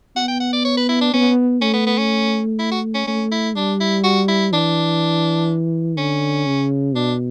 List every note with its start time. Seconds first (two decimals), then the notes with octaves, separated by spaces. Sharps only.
0.16 B3 F#5
0.28 G5
0.40 F#5
0.53 D5
0.65 C#5
0.77 B4
0.89 E4
1.01 D4
1.14 B3 C#4
1.62 A3 C#4
1.74 B3
1.86 B3
1.98 C#4
2.59 E4
2.71 F#4
2.94 C#4
3.07 A3 C#4
3.32 E4
3.56 G3 D4
3.80 E4
4.04 F#4
4.28 E4
4.52 E3 D4
5.98 D3 C#4
6.46 C#3
6.95 B2 D4